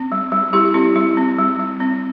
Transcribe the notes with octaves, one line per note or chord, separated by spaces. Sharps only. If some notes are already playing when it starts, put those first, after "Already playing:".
Already playing: C4
G3
G3
G3 E4 G4
C4 E4
G3 E4
C4
G3
G3
C4